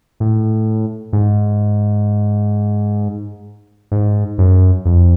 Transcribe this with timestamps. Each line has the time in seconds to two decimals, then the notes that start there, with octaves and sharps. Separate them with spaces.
0.20 A2
1.13 G#2
3.92 G#2
4.38 F#2
4.85 F2